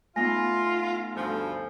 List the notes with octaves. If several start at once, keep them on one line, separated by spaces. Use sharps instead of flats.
A3 B3 D#4 F4 G#5 A#6
D2 G2 F3 A4 G#5